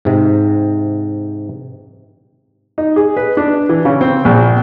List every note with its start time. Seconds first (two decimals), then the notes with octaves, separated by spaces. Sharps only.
0.05 G#2 C3
2.78 D#4
2.96 G#4
3.17 B4
3.37 D4
3.69 E3
3.85 C#3
4.01 C4
4.25 A#1